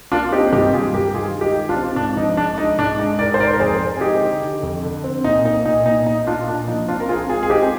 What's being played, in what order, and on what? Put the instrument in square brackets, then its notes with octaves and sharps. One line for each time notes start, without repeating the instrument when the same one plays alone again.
[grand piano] A#3 D4 F4
C4 D#4 G4
G2 D#4 G4
G2 F4 G#4
G2 G4 A#4
D#3 F4 G#4
G#3
D#4 G4
D#3
D4 F4
C4
G#2 D4
F3 D#4
G#3 D4
G#3 D#4
G#2 D4
G#3 D#4
G#2 A#4 D5
C5
G#2 A#4 D5
A#4
F2 G#4 C5
C4
G#4
G#3 D#4 G4
D3
D3
F2
D3
C4
A#2 D#4
A#3 D#4
A#2 D#4
A#2 D#4
A#2 D#4
A#2 D4 F4
A#2 D4
F3 D#4
C4 D4 F4
A#4
C4 F4 G#4
G#3 F4 G#4
G#4
C4 D#4 G4